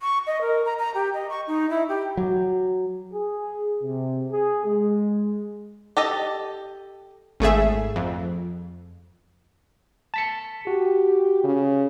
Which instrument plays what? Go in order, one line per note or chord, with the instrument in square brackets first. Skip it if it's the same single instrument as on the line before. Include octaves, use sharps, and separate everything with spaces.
[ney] C#6
D#5
A#4
A#5
A#5
G4
D#5
C#6
D#4
E4
G4
[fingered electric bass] F#3
[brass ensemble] G#4
C3
G#4
G#3
[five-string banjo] G4 A4 D#5
[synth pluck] G#1 A3 G#4 E5
F2
[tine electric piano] A5 B6 C#7
[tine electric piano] F#4 [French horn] G4
[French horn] C#3